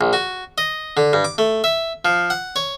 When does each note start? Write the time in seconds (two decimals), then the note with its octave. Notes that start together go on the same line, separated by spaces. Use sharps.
0.01 A#1
0.13 F#4
0.58 D#5
0.97 D3
1.13 G2
1.24 D6
1.38 A3
1.64 E5
2.05 F3
2.30 F#5
2.56 C#5